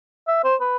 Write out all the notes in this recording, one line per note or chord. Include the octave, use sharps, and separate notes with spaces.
E5
C5
B4